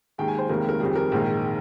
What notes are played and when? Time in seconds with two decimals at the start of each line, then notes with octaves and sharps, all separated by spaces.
0.18 D#2 D#3 G#3 G5
0.28 G#5
0.38 C5
0.49 F1 D#2 D#3 G#3 A#4
0.69 A#4
0.80 F2 D#3 G3 G#4
0.96 A#4
1.12 A#1 G#2 D#3 G#3